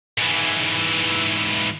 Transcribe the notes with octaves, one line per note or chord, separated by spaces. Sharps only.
G#2 E3